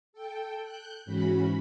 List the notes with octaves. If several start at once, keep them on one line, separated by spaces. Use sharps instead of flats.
A4 G5
F#6 G6
G#2 E3 C#4 F#4 B5